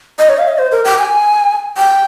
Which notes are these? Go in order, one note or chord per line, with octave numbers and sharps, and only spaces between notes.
D#5
C#5
F5
D#5
C5
A#4
G5
G#5
G5